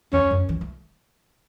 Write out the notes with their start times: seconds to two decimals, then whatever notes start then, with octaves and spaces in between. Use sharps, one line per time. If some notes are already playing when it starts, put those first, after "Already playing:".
0.13 E2 C#4
0.31 F#2
0.49 E3
0.61 A3